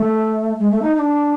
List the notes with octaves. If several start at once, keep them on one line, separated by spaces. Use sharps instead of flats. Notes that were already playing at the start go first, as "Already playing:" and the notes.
Already playing: A3
G#3
A3
D#4
D#4
D4